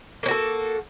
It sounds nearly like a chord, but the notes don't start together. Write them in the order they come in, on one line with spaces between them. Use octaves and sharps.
A#3 C#4 F#4 A4